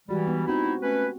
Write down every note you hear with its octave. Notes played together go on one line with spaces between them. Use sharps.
E3 G3 G#3 F#4 G4
B3 D#4
C4 D#4 E4 F#4
A3 C#4 B4